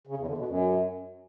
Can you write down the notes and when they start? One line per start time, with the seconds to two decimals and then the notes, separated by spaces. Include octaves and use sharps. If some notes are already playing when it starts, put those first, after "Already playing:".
0.07 C#3
0.17 E2
0.27 D3
0.37 B2
0.47 F#2